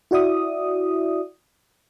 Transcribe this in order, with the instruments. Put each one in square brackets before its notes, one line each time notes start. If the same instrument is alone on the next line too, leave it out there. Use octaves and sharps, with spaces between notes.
[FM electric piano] E4 F#4 D5 E5 D#6